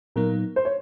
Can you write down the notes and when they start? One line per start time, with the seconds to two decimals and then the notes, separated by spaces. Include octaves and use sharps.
0.16 A#2 F#3 B3 D#4 A#4
0.56 C5
0.65 C#5